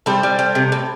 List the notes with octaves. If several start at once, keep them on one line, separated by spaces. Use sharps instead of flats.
G3 A4 C5
G3
G3
C3
A2